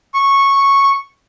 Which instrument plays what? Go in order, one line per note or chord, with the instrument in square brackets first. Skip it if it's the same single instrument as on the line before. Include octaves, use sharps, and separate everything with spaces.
[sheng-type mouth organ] C#6